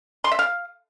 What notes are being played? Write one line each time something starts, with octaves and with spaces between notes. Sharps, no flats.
C6
E5
F5